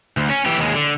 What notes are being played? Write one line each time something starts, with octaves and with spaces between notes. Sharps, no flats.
D2
C#4
E3 G4
D#2 G#3
D3